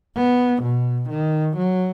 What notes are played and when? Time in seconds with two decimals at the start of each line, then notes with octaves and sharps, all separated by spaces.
0.15 B3
0.63 B2
1.10 D#3
1.57 F#3